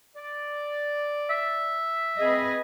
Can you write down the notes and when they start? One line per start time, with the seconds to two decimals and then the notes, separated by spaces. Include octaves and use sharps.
0.16 D5
1.30 E5
2.20 C4 G#4 B4 D#5